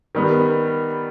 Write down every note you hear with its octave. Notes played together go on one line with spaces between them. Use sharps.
D#3 G3 B3